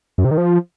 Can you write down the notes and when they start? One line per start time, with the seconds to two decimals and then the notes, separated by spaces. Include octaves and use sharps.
0.18 F#2
0.25 C3
0.31 D#3
0.38 F3